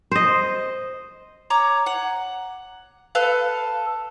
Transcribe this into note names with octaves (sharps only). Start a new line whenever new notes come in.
C5 D#5
C#5 A#5 D6
F#5
A4 B4 F5